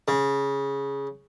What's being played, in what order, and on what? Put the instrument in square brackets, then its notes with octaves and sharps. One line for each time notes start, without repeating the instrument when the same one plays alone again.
[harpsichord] C#3